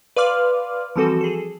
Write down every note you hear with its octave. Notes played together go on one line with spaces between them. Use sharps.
B4 D5 F5 C6 D6 F6
E3 F3 G3 C4 F#4 A4
G#4 A4